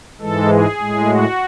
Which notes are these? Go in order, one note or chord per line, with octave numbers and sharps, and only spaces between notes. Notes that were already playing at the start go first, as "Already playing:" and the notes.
G#2 E3 G#3 A4
G#4
A2 G#3
F#4